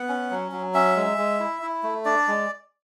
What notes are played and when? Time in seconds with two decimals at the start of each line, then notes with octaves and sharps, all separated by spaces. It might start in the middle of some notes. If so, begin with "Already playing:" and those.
Already playing: B3 F#5
0.09 C#4
0.31 F#3
0.52 F#3
0.74 C#4 E5
0.96 G#3
1.18 G#3
1.40 E4
1.62 E4
1.83 A3
2.05 D4 D5
2.28 G#3